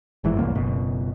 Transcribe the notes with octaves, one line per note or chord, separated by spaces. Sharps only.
G1 G#2 E3
D1 C2 F#2 A#3
F#1 B2